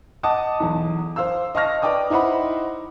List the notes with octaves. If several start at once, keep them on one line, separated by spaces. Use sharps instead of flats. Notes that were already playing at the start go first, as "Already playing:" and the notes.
D#5 F#5 A5 D6 D#6
B1 E2
C5 F5 E6
D#5 F5 A5 C#6 F6 A#6
B4 D5 G5 D6 D#6
D#4 E4 C5 F#5 B5